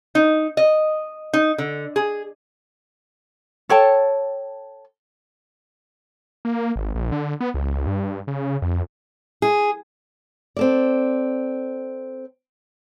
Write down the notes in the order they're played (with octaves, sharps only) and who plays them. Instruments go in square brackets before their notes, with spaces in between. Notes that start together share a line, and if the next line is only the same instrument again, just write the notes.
[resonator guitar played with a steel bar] D#4
D#5
D#4
D3
G#4
[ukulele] A4 C#5 G5 A5
[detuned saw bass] A#3
G#1
A#1
D3
B3
C#2
G2
C#3
F2
[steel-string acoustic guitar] G#4
[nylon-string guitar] C4 A4 D5